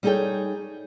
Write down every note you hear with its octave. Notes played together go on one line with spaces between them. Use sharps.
G3 D#4 G#4 A4 C#5 G5